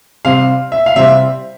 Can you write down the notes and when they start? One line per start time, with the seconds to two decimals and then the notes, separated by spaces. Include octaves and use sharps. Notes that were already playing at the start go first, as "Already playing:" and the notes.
0.25 C3 G3 C4 F5
0.72 E5
0.86 F5
0.96 C3 G3 C4 E5